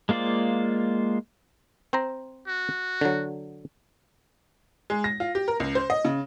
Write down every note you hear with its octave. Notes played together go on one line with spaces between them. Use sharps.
G#3 A#3 F4 C5 D5
C4 C5 A#5
F#4
D3 F#3
G#3
A#6
F4
G4
A#4
C#2
C5
D#5
C#3